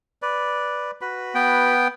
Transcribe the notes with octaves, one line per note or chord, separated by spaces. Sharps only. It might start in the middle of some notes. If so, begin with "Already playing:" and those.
B4 D5
F#4 B4 B5
B3 G5